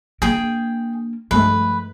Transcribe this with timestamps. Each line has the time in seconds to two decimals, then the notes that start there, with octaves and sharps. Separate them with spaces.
0.22 A#3 D4 G#4 G5
1.31 G2 F3 G#3 A3 B4